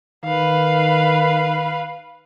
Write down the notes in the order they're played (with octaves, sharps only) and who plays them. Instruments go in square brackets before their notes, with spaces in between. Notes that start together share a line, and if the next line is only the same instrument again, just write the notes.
[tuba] D#3 [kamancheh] B4 F5